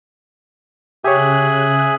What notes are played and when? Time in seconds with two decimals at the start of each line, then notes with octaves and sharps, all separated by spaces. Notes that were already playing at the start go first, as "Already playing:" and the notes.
1.05 C#3 G4 G#4 C#5 E5 G#5 F#6